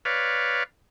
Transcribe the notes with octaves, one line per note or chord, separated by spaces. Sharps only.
B4 C#5 D5 F5